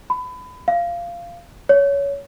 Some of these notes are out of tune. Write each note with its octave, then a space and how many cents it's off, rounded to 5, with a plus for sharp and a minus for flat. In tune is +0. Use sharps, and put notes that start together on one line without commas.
B5 +25
F5 -15
C#5 +20